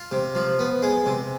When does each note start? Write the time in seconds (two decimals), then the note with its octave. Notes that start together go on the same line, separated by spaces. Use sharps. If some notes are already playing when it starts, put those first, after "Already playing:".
Already playing: F4
0.12 C3
0.35 F3
0.59 B3
0.82 G#3
1.06 C3